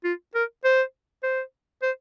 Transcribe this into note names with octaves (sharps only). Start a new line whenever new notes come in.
F4
A#4
C5
C5
C5